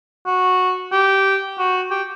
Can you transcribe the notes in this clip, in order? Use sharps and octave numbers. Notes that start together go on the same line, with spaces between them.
F#4
G4
F#4
G4